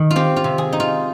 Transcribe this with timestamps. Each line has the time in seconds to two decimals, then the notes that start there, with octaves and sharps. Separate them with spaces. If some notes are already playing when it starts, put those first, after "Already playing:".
Already playing: D#3
0.11 F4
0.16 C4 G4
0.36 F4
0.44 C3
0.58 G#4
0.73 D#4
0.80 F4